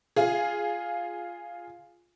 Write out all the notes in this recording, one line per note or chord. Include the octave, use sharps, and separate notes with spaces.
F4 G#4